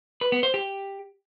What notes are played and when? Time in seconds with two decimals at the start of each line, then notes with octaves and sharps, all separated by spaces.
0.21 B4
0.32 B3
0.43 C5
0.54 G4